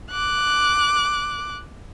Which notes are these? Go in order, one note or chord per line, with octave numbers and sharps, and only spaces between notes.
D6 F#6